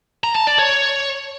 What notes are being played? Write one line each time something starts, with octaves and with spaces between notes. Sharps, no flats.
A#5
A5
D5
C#5